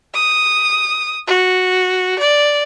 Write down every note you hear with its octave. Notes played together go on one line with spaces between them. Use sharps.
D#6
F#4
D5